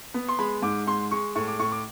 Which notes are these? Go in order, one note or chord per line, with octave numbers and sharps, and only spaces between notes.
B3
C6
G#3 B5
G#2 D6
G#3 C6
G#3 C#6
A2 C#6
D6
A2 C#6
D6